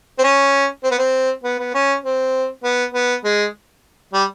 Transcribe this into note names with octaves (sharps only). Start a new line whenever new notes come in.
C4
C#4
C4
B3
C4
B3
B3
C#4
C4
B3
B3
G#3
G3